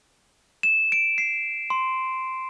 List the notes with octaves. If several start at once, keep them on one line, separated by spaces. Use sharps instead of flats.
E7
D7
C7
C6